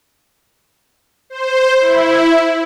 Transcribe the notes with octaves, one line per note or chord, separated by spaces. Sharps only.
C5
E4